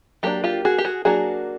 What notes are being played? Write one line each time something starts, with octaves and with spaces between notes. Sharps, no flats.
F#3 A#3 D4 G4 A4
F4 G4
F#4 G#4
G4
F#4 G#4
F#3 A#3 D4 F#4 G#4